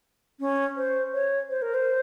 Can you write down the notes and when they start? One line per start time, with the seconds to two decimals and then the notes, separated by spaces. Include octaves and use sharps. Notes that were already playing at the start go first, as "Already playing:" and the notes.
0.40 C#4
0.77 C5
1.13 C#5
1.50 C5
1.62 A#4
1.74 C5